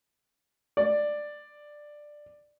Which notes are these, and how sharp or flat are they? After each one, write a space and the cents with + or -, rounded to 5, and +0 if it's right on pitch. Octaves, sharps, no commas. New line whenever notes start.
D5 +10